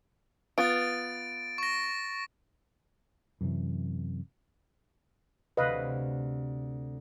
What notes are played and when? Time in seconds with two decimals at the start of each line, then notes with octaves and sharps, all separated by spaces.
0.58 B3 F4 A6 D7
1.58 C#6 A#6
3.41 F#2 C3 E3
5.57 D2 C3 B4 D#5 F5